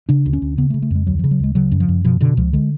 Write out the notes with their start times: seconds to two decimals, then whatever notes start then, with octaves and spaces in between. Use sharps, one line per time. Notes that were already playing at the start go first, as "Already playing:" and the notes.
0.09 C#3 D4
0.26 D2
0.33 C#4
0.42 D2
0.58 C#3 B3
0.70 A3
0.74 C#3
0.82 A3
0.91 F2 G#3
1.07 D2 F#3
1.19 C#3 F3
1.31 F#3
1.40 D2 G#3
1.55 C#3 F#3
1.72 F#2
1.80 F3
1.89 F#2
2.05 B2 F3
2.21 B2 D3
2.37 C#2 F3
2.53 D3 G#3